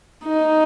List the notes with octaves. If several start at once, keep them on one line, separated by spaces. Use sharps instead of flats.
D#4